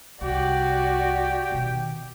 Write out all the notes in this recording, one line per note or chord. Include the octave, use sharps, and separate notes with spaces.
C2 F#4 G4 D5
B2 D#3